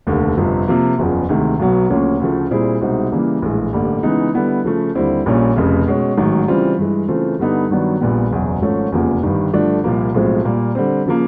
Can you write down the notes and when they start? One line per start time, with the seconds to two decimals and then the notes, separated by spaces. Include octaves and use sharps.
0.07 F1 D#2 D3
0.37 G1 F2 C3 F3
0.68 C3 F3 A#3
0.99 F#1 E2 C#3 F3
1.29 D2 C3 D#3 G#3
1.59 B1 B2 F#3 B3
1.90 D2 C#3 F3 A#3 C#4
2.20 D2 C#3 F3 A3
2.51 A#2 G3 C4 E4 G#4
2.81 C2 B2 G#3 C4 D#4
3.12 C#3 E3 G3 A#3
3.42 A#1 A2 E3 G#3
3.73 A1 G2 D3 G3 A#3
4.03 C#3 E3 G#3 B3 D#4
4.34 D3 G3 B3 E4
4.64 C#3 F3 A3
4.95 D#2 D3 G3 C4 E4
5.26 A#1 A#2 G3 A#3 C#4
5.56 F1 F2 C#3
5.87 B2 G#3 C#4
6.17 A1 G#2 D#3 F#3
6.48 C#3 E3 G3 C4 F4
6.78 G2 E3 G#3
7.08 C#3 E3 A3 C4 F4
7.39 G2 D3 G3 B3 D#4
7.70 G2 D#3 F#3 B3 D4
8.00 A#1 A#2 G3 B3
8.31 F#1 E2 B2 F#3
8.61 G#1 G#2 F3 A3 C#4
8.92 F1 E2 C#3 F3 A#3
9.22 G1 G2 D#3 G3
9.53 G2 D3 F3 A3 D4
9.84 C2 A#2 F3 A#3
10.14 B1 A2 F3 G#3 C4
10.45 A#2 G3 A#3
10.75 D3 G3 C4
11.06 C#3 F3 A#3